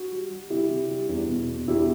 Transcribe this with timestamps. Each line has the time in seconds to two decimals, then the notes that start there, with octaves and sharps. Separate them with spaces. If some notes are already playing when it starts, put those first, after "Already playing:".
Already playing: F#4
0.11 G3
0.31 G3
0.50 C3 E4 G4
0.70 C3
0.90 G3
1.09 E2
1.28 B2
1.48 B2
1.67 E2 E4 G4